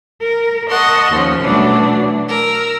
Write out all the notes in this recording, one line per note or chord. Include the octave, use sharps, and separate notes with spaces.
A#4
D#5 F#5 A5 C6 C#6
D#2 F3 C#4
B2 E3 F#3 A3 D4
A#4 E6